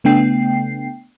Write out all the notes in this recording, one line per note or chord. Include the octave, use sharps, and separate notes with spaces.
C#3 A3 B3 D4 G5 C7